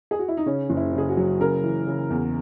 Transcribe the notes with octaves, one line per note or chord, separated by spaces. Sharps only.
G#4
F#4
E4
D#4
C#3 C#4
F#1
E4
C#3 G#4
F#4
F#3
C#3 A#4
E3
C#3
E2